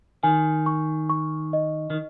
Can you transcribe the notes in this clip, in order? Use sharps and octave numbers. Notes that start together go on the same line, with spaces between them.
D#3 G#5
C#6
C#6
D#5
D#3